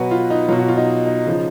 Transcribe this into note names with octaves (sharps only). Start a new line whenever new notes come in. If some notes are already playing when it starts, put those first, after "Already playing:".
Already playing: B2 F#3 F#4 B4
F4
D#4
B2 F#3 F4
F#4
F4
D#4
D#4
C#3 F3